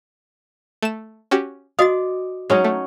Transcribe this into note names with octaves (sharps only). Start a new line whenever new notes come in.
A3 E7
C#4 F#4 G4
F#4 D5 D#5 F5 D#6 A6
F#3 G#3 C#4 D#4
A3